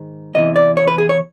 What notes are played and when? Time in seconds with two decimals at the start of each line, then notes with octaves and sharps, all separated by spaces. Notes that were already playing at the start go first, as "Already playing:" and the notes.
Already playing: G#2 D#3
0.35 E2 C3 E3 D#5
0.56 D5
0.77 C#5
0.87 B4
0.98 G#4
1.09 C#5